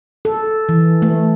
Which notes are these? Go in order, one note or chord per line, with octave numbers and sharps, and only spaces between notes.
A4
E3
A3